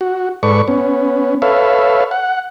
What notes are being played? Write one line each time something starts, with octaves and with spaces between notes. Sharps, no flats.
F#4
G#2 A4 B4 D5 C#6
B3 C#4
A4 B4 C#5 E5 F5
F#5